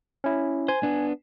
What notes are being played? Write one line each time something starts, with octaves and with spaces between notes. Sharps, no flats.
C#4 E4
C5 G#5
B3 D4